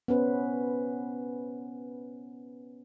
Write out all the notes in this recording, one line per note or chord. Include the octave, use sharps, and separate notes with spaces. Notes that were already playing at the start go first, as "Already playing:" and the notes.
B3 C#4 B4 C5